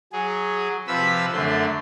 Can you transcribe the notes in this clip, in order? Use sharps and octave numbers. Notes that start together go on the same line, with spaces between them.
F#3 G#4
C3 F3 B4 B5 E6
F#2 D3 A3 C6